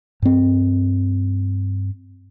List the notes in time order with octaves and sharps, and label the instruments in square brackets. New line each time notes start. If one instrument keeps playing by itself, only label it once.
[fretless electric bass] G2 C4